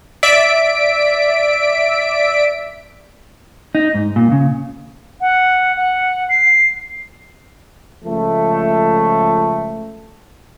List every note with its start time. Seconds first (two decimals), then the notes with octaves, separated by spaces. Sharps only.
0.23 D5 E5 B6 D7
3.75 D#4
3.94 G#2
4.16 A#2
4.32 C#3
5.21 F#5
5.76 F#5
6.29 C7
8.05 C#2 F3 A3